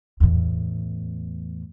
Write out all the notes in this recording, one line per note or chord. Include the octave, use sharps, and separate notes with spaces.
E2 A2